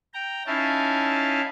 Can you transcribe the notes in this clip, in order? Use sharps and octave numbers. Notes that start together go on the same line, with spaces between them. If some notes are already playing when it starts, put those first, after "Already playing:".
G5 A#5
C#4 D#4 E4 F5 A5